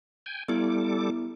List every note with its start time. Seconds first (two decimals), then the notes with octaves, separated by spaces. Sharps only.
0.26 G5 G#5
0.48 G3 B3 E4 A4 D6